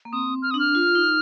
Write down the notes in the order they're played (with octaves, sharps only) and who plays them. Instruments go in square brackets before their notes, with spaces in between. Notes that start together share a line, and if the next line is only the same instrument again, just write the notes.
[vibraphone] A#3
[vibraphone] C4 [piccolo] D#6
[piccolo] F6
[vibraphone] D4 [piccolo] D#6
[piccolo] F6
[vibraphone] F4
D#4